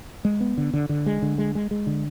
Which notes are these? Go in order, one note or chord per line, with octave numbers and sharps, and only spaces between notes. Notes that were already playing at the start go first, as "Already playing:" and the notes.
G#3
B3
D3
D3
D3
G#3
D3
G#3
G#3
G#3
D3